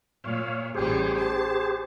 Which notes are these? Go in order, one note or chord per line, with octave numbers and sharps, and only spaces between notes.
A#2 C#5 F5
A1 A2 G3 G4 G#4 C5
A5